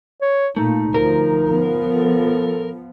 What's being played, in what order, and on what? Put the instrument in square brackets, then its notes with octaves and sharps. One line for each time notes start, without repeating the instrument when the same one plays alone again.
[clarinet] C#5
[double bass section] A#2 A#3 [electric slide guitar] A3 [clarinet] D#4
[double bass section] D2 F3 [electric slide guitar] A#4
[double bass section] F3 B3
[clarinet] A4